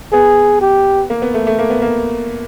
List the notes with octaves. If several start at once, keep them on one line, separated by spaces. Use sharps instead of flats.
B3 G#4
G4
A#3
B3
A3
A3
A#3
B3
A#3